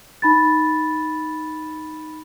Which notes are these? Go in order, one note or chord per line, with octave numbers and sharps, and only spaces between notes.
D#4 B5 A6